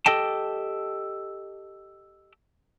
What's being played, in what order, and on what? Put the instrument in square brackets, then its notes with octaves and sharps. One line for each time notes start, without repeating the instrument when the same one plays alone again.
[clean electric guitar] G4 A4 D#5 G5 A5